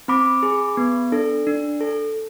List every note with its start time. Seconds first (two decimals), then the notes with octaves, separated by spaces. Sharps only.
0.08 C4 B5 D6
0.43 G#4
0.77 B3
1.12 D4 A4
1.47 D4
1.81 A4